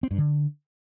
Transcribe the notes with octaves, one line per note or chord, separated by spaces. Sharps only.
C4
G2
D3